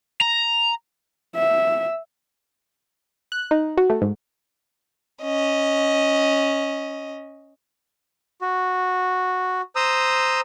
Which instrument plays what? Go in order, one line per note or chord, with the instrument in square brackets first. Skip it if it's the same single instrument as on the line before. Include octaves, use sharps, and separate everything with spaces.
[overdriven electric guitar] A#5
[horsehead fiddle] E5
[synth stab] F#6
D#4
F#4
A3
G#2
[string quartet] C#4 D#5
[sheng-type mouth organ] F#4
C5 A#5 D#6 E6